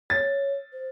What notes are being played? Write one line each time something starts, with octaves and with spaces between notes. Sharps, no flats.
C#5 A6
C5